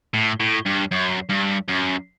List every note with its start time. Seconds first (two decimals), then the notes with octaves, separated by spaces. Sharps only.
0.14 A2
0.40 A2
0.65 G2
0.91 F#2
1.30 G2
1.68 F#2